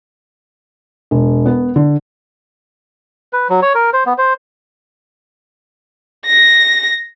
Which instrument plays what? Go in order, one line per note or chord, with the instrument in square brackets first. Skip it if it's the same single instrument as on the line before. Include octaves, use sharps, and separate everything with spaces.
[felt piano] E1
B3
D3
[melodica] B4
F#3
C#5
A#4
C5
B3
C5
[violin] A#6